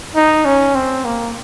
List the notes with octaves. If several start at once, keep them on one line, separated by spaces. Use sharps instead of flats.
D#4
C#4
C4
A#3